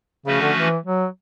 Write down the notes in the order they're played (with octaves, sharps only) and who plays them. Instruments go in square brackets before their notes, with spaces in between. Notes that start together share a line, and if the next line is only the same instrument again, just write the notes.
[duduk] C#3 [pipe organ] F3 A3 C#4 F#4 B4
[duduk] D3
E3
F#3